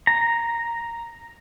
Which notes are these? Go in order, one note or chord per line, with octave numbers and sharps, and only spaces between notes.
A#5